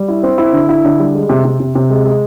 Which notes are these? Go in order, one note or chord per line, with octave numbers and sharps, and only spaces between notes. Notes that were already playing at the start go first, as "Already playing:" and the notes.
Already playing: G3
E4
C4
E4
D3
E4
D3
G3
G#3
C3
C3
C3
C3
G#3
G#3